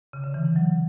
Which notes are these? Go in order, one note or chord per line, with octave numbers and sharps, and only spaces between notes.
C#3
D3
E3
E3
F#3